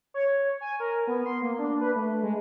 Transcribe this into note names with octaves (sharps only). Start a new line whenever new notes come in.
C#5
G#5
A#4
B3
C6
A#3
D4
B4
A3
G#3